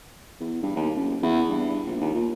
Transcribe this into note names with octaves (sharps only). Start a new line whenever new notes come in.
E2
G2
D#2
F#1
E2
G2
A#1
D#2
A#2